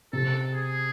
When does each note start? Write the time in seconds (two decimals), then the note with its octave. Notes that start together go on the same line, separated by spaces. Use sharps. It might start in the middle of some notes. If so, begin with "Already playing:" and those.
0.13 C3 A4
0.54 G#4